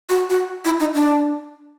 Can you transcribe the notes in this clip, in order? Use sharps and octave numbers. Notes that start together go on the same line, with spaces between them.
F#4
F#4
E4
D#4
D4